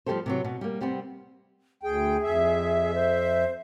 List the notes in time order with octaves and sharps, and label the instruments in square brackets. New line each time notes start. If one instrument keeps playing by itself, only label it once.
[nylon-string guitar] F3 G3 G#3 G4 A4 C5
C3 E3 F#3
B2
G3 A#3
C3 G3 B3 C4
[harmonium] D2 G5 [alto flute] G#4
[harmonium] F2 E5
[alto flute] C5